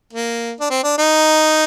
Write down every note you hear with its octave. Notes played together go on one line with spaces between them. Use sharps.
A#3
D4
C4
D4
D#4